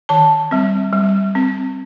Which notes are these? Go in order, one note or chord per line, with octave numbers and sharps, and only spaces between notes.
D#3 A5
G3 C4
G3
C4